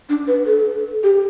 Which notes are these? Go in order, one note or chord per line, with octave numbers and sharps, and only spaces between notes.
D4
B4
A4
G4